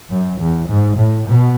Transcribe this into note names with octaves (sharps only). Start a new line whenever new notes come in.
F#2
E2
G#2
A2
B2